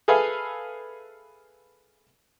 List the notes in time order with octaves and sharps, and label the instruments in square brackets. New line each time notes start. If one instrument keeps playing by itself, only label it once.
[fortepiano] G#4 A4 B4 E5 F5 G#5